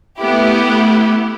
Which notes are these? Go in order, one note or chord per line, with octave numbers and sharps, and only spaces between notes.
A3 B3 E4 G4